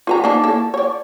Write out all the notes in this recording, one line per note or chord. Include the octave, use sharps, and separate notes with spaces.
F4 B4 A#5
A#3 D4 D#4
A#3 E4 A4
C#5 D5